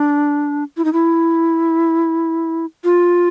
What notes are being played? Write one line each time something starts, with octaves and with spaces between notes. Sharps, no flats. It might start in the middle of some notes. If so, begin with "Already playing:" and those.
Already playing: D4
E4
D#4
E4
F4